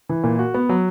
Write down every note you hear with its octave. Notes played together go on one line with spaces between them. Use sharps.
E3
A#2
F#4
B3
F#3